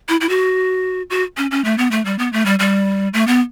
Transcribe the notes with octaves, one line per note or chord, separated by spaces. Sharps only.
E4
E4
F#4
F#4
C#4
C#4
A3
B3
A3
G3
B3
A3
G3
G3
A3
B3